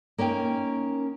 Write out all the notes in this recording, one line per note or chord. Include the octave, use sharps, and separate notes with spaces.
A#3 C#4 D#4 G5